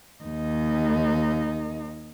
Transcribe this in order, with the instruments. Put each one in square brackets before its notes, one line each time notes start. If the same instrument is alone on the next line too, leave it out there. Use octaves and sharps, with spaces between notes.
[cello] D#2 D#4